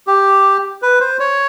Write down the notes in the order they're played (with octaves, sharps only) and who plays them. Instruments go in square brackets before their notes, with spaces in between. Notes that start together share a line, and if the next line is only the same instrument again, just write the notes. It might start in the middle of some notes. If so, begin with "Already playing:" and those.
[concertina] G4
B4
C5
C#5